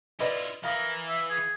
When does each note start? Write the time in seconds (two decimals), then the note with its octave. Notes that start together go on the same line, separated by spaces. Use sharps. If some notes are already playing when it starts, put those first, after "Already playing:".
0.20 E4 F4 B4 D5 D#5
0.64 E3 E4 A#4 F5 D#6
1.09 E5
1.30 G#4